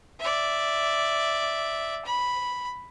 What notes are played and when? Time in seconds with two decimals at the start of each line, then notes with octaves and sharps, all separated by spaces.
0.20 D5 E5
2.05 B5